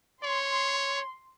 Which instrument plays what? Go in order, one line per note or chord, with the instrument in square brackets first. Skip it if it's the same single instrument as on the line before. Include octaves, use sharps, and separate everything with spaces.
[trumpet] C#5 [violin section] C6